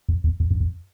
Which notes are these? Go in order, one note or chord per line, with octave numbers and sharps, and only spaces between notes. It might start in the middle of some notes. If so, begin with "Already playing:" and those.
F2
E2
F2
F#2
F2